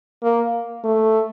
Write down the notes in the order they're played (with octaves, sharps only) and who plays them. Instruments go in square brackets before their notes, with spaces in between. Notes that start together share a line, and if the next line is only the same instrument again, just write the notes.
[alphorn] A#3
A3